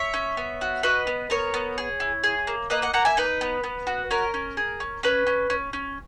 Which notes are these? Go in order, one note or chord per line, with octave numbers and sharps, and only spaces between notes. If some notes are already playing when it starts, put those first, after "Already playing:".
Already playing: C#5 E5
C#4
B3
F#4
F#4 B4 D#5
B3
B3 A#4 C#5
B3
G#4
E4
G#4
A#3
A#3 B4 D#5
D#5 F#5
A#3 F#5 A#5
E5 G#5
D#4 B4
B3
B3
F#4
C#4 A#4
C#4
G#4
C#4
C#4 B4
C#4
C#4
C#4